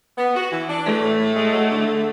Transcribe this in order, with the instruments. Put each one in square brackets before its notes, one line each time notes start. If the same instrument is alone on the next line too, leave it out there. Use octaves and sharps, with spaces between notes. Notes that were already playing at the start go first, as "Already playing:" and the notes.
[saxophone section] B3
F#4
E3
D4
[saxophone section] E3 [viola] A3
[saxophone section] A2
A2
G#3
F#3
D3
D3